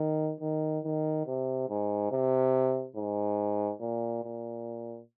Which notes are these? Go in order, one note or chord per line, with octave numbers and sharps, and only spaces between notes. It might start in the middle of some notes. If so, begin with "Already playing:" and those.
Already playing: D#3
D#3
D#3
C3
G#2
C3
G#2
A#2
A#2